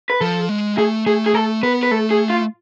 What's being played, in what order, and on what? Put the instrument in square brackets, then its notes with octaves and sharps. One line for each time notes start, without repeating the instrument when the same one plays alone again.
[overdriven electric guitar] B4
[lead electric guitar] F3 [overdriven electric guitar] A4
[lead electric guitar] G#3
[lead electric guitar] A3 [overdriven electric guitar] G#4
[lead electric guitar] A3 [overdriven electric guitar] G#4
[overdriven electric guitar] G#4
[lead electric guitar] A3 [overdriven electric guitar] A4
[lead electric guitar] B3 [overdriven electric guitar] B4
[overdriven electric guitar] B4
[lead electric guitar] A3 [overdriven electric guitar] A4
[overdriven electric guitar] G#4
F4